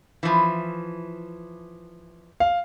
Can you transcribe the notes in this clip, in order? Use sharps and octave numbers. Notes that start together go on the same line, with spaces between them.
E3 F3
F5